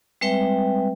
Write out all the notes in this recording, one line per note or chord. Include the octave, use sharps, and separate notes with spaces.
G3 G#3 C4 B4 E5 G5